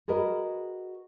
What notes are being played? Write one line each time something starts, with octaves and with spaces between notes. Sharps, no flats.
F#4 G#4 A#4 B4 D#5